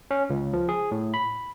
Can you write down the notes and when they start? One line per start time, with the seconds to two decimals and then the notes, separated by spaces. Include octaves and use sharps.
0.11 C#4
0.30 C#2
0.53 F3
0.69 G#4
0.91 A2
1.14 B5